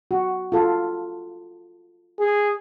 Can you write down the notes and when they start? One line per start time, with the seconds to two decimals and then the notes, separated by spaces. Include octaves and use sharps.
0.11 F#4
0.52 F4 A4
2.19 G#4